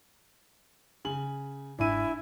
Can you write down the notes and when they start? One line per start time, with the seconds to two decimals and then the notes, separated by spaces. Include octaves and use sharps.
1.05 C#3 G#5 F#7
1.79 G1 G#2 D4 E4 G#5 D#7